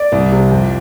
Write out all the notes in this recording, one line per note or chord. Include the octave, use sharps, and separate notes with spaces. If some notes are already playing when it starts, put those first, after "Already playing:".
Already playing: D5
C2
C3
F2